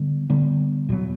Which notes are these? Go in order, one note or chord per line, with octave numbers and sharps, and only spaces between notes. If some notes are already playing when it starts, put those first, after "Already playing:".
Already playing: D3 G3 B3
D3 G3 B3
E2 B2 F#3 B3